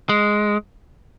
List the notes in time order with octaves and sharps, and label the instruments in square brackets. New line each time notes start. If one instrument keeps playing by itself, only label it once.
[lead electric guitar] G#3